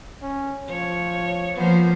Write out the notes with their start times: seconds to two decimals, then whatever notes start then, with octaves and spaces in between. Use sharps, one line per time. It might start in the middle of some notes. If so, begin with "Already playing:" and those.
0.22 C#4
0.70 F3 C#5
1.58 F3 A#3 B3 C5